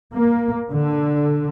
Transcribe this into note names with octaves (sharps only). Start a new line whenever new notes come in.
A#3
D3